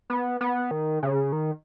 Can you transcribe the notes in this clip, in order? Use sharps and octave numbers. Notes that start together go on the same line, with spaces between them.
B3
B3
D#3
C#3
D#3